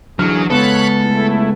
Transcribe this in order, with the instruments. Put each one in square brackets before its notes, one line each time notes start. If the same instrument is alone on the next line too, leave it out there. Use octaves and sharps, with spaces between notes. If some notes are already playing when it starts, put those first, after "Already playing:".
[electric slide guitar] D3 E3 [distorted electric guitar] F#3 [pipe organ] G#4 [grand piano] F6
[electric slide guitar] C#3 G#3 [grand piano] B3 [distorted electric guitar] A4 [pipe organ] C#5 B5 F#6
[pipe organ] A3 E4